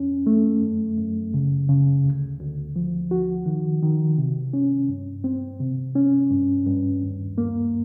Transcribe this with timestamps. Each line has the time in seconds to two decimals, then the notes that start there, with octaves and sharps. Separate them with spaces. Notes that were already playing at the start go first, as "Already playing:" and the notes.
Already playing: F2 C#4
0.26 A3
0.62 F#2
0.98 F#2
1.34 C#3
1.69 C#3
2.04 D2
2.40 D2
2.76 F3
3.11 F#4
3.46 D#3
3.82 D#3
4.18 C3
4.53 C#4
4.88 G2
5.24 C4
5.60 C3
5.96 C#4
6.31 G2
6.66 G2
7.02 D#2
7.38 A#3